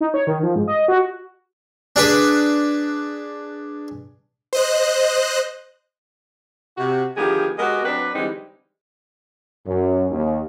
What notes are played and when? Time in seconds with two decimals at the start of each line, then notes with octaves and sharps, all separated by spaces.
0.01 D#4
0.14 C#5
0.27 D#3
0.43 F3
0.56 G#2
0.68 D#5
0.88 F#4
1.96 D4 G#4 B4
4.53 C5 D#5 F#6
6.78 C3 F#4
7.17 D3 D#3 F3 B3 G4 G#4
7.59 G#3 B3 F#4 G4 A#4 D#5
7.84 F#3 C4 D4 B4
8.15 D3 E3 G3 G#3 C4 D#4
9.66 F#2
10.11 D#2